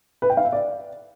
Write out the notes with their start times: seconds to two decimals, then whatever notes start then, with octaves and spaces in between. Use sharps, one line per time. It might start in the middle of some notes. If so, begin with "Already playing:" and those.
0.22 B4
0.30 G5
0.37 F5
0.45 E5
0.52 D5